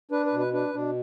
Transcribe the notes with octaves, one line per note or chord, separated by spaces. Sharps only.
D4 B4
B4
B2
B4
D4 B4
B2 D4